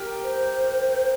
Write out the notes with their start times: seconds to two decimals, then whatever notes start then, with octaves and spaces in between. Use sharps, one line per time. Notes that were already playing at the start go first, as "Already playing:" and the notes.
Already playing: G4 A#4
0.23 C5